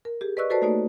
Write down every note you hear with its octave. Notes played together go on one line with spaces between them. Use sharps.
A#4
G4 G#4
B4 D5 D#5 C#6 E6 F#6
F#4 A4 B4 C5 D5 A5
A3 A#3 D#4 F#4 C#5 D5